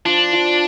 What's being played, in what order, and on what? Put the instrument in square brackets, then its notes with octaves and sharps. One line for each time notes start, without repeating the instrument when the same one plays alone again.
[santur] F3 [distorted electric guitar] D4
[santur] F3